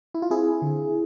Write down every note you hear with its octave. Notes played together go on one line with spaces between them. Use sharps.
E4
F4
C4 E4 G#4
D3